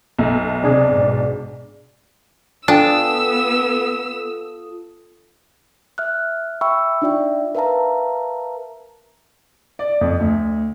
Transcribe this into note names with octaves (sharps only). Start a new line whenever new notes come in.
B1 A4 E5 A5
D2 C3 C4 D4 G#4 D5
G#2 B2
B3 D4 F4 A4 G5 G#5 D#6 E6
E5 F6 F#6
E5 G5 B5 C#6 E6
D4 D#4 F4 D5 E5 G5
A#4 B4 E5 F5 A5 A#5
D5
F2
D2